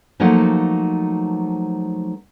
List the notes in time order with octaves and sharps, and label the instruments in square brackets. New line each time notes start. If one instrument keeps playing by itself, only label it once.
[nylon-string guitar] F3 F#3 A3 A#3 D#4 F#5